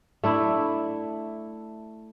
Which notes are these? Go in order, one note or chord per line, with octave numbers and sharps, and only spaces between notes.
A3 D4 E4